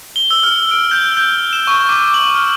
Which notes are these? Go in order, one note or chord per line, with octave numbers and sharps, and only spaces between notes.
G7
E6
F6
D7
G6
G6
E7
C#6
D6
F#7
F6